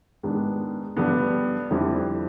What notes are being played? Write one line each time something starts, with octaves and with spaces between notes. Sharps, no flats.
G#2 D#3 G#3 B3 D4
G2 D3 G3 B3
F2 D3 G3 C4 E4